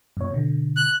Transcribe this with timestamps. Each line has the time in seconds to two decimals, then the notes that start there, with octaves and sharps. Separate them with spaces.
0.17 F#2 A#2 C#5
0.31 B2 D3
0.77 F#6